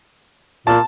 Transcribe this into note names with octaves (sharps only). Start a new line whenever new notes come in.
A#2 A5